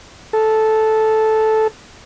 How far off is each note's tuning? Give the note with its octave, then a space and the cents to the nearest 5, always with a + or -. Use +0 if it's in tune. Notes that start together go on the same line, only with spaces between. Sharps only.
A4 -10